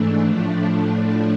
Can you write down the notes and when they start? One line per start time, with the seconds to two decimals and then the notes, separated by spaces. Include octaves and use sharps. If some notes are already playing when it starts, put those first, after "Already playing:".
Already playing: G#2 E3 A3 D4
0.24 A2 F3 A3 D4